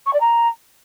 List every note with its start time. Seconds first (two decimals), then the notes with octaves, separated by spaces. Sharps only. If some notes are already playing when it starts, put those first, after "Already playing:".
0.06 C#6
0.13 D5
0.20 A#5